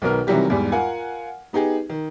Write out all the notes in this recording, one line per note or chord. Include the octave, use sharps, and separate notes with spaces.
B1 D#3 B3 A#4 F6
C3 D#3 E3 F#3 G3 G4
E2 G#2 G3
F4 A#4 F5 F#5 G#5
B3 D#4 G4 G#4
D#3